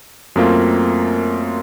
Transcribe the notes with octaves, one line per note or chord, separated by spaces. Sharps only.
F#2 A3 A#3 C4 F4